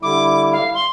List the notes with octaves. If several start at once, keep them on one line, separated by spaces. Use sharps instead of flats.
D3 G3 E4 D6
F5
C6